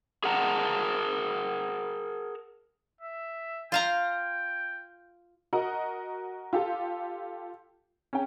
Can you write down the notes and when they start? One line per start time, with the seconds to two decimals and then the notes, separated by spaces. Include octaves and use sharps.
0.24 G#4 A#4 F#5 A5 A#5
3.01 E5
3.72 F4 F5 G5 A#5
5.53 F#4 A#4 D#5 F#5
6.53 F4 G4 A4
8.13 C#4 G#4 G5